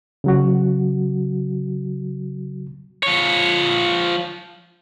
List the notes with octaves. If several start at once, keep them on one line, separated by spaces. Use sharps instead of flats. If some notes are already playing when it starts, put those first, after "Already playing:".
C#3 F#3 F#4
F3 C#5